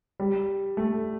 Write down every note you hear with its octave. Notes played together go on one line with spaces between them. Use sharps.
G3
A3